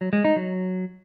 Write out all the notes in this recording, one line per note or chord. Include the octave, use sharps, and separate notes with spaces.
F#3
G#3
D#4
F#3